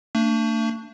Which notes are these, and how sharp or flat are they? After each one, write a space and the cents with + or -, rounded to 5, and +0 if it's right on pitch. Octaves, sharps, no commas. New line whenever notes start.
A3 +40 D4 +0